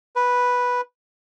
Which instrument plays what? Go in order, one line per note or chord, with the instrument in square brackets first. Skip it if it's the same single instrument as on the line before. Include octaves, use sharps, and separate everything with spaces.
[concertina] B4